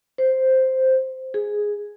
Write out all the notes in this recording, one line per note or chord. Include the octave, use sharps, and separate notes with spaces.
C5
G#4